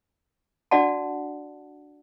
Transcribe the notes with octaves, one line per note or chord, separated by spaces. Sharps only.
D4 F#4 D5 F#5 A5